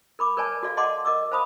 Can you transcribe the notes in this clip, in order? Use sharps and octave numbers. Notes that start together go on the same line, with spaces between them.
A#4 B5 D6
A#4 B4 C#5 D5 G#5 A5
F#4 A4 D5 F5
D5 D#5 F#5 A5 C6 D6
A#4 D#5 D6 E6
C5 F5 A5 B5 D#6